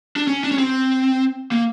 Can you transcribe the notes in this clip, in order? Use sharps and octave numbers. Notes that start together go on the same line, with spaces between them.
D4
C#4
D4
C#4
C4
A#3